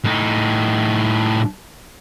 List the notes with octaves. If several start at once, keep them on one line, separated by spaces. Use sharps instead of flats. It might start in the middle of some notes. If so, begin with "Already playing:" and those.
A2 D#4